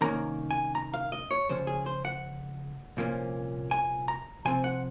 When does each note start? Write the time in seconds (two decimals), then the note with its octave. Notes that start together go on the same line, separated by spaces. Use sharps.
0.01 C2 C3 D#3 A#3 C#4 A#5
0.51 G#5
0.75 A#5
0.94 F5
1.12 D#5
1.31 C#5
1.49 C#2 C#3 F3 C#4 C5
1.67 G#4
1.86 C5
2.05 F#5
2.97 C2 A#2 F3 A#3 C#4
3.71 G#5
4.08 A#5
4.45 C3 F3 C4 G#5
4.64 F#5